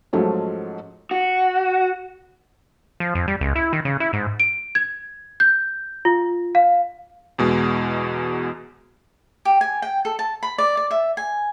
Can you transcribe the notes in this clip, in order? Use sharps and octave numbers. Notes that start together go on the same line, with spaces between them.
G#2 F3 F#3 G#3 A3 C#4
F#4
F3
F2
G3
C#2
E4
D#3
C#3
E4
G#2
D7
G#6
G6
F4
F5
E2 B2 G#3
G4
G#5
G5
A4
A5
B5
D5
D5
E5
G#5